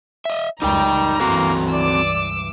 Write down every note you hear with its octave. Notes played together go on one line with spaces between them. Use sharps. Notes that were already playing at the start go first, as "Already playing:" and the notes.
D#5 E5
C#2 F#2 G3 D#4 A#4 G5 A#5
C#2 G2 E3 A#3 C4 F#4 A4
D5 D6 E6